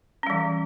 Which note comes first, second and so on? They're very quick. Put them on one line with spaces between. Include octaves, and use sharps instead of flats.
C#4 G3 E3